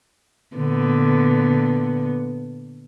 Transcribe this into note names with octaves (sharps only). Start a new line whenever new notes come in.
A#2 D3 B3